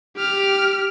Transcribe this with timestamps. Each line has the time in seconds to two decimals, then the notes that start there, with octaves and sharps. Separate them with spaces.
0.17 G4 F6